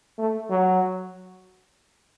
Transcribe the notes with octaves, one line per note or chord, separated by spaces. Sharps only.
A3
F#3